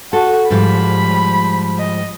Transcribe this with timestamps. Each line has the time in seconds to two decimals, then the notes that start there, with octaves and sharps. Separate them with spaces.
0.13 F#4 A4
0.50 G#2 F3 G3 B5
1.79 D#5